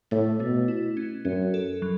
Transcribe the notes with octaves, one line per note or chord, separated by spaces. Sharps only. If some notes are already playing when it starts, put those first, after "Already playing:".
A2 A3
B2 A3
E4
C#4
F#2 C#4
A4
F#3